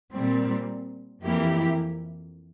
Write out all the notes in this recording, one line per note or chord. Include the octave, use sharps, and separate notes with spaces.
A#2 G3 C4
F2 E3 A#3 E4 G4